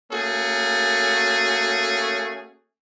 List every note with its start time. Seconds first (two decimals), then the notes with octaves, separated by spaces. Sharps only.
0.11 A3 A#3 C#4 F#4 G#4